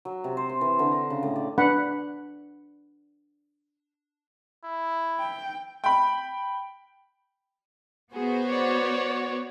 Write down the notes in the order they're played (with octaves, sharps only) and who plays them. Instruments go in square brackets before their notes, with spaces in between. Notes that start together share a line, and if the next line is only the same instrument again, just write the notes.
[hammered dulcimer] F#3
C3
C5
C4
E3
D3
A#5
C#3
A2
D5
[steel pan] D4 B4 F#5 B5
[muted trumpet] E4
[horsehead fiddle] G5
[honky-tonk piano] G5 B5
[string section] B3 F#4 C5 [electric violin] G#4
[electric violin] C#5 D5